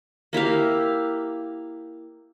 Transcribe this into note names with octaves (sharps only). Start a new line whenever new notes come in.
A#3 E4 G4 F5